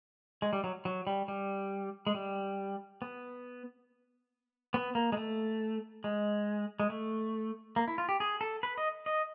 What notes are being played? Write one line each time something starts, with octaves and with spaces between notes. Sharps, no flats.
G#3
G3
F#3
F#3
G3
G3
G#3
G3
B3
B3
A#3
G#3
A3
G#3
G#3
A3
A#3
E4
F4
G4
G#4
A4
B4
D#5
D#5